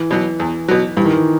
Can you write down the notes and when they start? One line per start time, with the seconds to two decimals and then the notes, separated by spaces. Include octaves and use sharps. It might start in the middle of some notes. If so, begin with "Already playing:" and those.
Already playing: E3
0.11 B2 F#3
0.40 E2
0.68 B2 F#3
0.97 G2 E3
1.05 D#3
1.14 E3